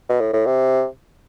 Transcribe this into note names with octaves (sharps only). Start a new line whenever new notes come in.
B2
A2
A2
C3